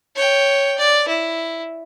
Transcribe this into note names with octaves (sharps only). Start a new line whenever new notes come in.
C#5 G5
D5
E4